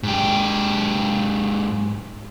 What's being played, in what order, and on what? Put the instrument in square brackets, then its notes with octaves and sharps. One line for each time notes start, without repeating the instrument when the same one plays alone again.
[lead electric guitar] G#2 G4